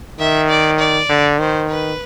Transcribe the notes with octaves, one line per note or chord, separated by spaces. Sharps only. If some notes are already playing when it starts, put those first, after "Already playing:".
D#3 E5
D5
D5
D3
D#3 C5
B4